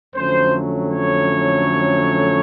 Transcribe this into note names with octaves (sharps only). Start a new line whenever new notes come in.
F2 D3 F#3 A3 C#4 C5
C#5